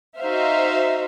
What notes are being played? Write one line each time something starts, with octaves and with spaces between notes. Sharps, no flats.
D#4 F#4 C5 E5 F5